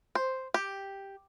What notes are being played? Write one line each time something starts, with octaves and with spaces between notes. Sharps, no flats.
C5
G4